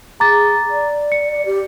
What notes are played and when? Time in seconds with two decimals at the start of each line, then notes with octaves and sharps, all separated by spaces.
0.20 G#4 A#5 D6 A6
0.70 D5
1.12 C#7
1.46 G4